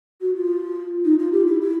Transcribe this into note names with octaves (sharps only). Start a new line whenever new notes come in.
F#4
F4
D#4
F4
G4
E4
E4